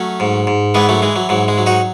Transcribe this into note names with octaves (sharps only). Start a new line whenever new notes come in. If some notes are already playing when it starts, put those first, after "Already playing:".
Already playing: F#3 A3 C#4
G#2
G#2
E3 G#3 B3
F#3 A3
E3 G#3
F#3
G#2 F#3
G#3
F#3
D#4 F#4